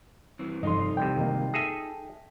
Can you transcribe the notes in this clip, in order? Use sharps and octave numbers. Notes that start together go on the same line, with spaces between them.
G2 E3 C4
F1 G2 D#4 F4 D#5 C6
C2 C3 G5
G#1 A#3 D#5
G#4 A4 E5 A#6 B6